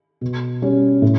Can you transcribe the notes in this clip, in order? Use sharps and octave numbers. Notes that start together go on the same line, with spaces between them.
B2
G3 C#4
A2